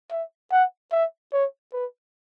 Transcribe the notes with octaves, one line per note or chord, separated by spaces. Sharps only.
E5
F#5
E5
C#5
B4